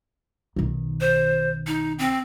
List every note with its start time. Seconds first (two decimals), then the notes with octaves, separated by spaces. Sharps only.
0.56 B1 D#3
1.01 C5
1.67 D#4
1.99 C4